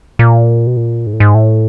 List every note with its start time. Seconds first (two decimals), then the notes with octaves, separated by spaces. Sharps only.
0.19 A#2
0.67 B2
0.77 A#2
1.07 G#2
1.13 A2
1.20 G#2
1.35 A2